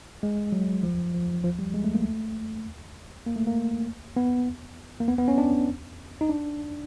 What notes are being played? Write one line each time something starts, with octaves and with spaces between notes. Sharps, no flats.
G#3
F#3
F3
F3
F3
G3
G#3
A3
A#3
A3
A#3
A3
A#3
B3
A#3
B3
B3
C#4
D4
D#4
D4